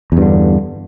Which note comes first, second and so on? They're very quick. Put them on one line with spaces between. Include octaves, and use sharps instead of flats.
E2 G2 D3